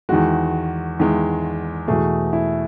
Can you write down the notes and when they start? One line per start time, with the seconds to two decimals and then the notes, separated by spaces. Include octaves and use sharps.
0.09 E2 D#3 G#3 F#4
0.99 E2 D#3 G#3
1.88 E2 B2 A3 G#4
2.33 E4